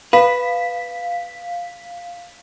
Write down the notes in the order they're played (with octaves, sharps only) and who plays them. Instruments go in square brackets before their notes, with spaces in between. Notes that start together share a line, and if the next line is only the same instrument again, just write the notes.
[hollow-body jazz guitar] B4 [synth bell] F5 B6